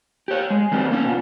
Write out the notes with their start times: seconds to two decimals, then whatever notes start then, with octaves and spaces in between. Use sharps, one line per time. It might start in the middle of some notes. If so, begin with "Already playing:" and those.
0.28 G4 C#5
0.50 G#3
0.71 D#3 F#3 G3 A3 C4
0.91 A#3 C#4
1.05 B2 F4